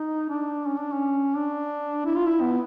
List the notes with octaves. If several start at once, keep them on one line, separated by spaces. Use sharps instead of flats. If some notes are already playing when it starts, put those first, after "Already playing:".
Already playing: D#4
D4
C#4
D4
C#4
D4
E4
F4
E4
B3